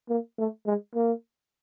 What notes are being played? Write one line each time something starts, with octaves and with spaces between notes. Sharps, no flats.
A#3
A3
G#3
A#3